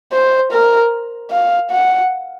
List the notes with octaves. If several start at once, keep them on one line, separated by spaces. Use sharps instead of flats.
C5
A#4
F5
F#5